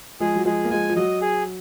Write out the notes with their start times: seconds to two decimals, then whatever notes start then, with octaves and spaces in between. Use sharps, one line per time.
0.20 F3 G#3 G#4
0.36 F#3
0.45 F3 G#3 G#4
0.64 A#3
0.70 F3 G#3 G#5
0.89 F3
0.96 F#3 D#5
1.22 G#4